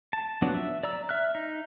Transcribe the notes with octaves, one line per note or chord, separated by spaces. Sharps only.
A5
F3 F#3 B3 D4 F#4
E5
D5 A#5 E6
E5 F6 F#6
D#4